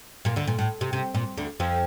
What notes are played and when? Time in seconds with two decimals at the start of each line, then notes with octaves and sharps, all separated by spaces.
0.25 A#2 A#3
0.36 D2 D3
0.47 A#2
0.58 A2
0.81 C3
0.93 C3
1.15 A#2
1.37 D2 D3
1.60 F2 F3